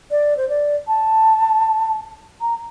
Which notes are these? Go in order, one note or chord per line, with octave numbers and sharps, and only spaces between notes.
D5
C5
D5
A5
A#5